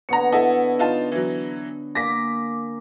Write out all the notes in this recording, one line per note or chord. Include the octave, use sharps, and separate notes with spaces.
D3 B3 C#5 A#5 C#7
E4 A4 D#5
D#4 F4 A5
E3 F#3
A#3 G#5 D6 A#6 B6